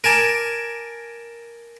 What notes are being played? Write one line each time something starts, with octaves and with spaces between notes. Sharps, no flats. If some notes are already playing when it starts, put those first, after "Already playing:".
A#4 G#5 A5 D6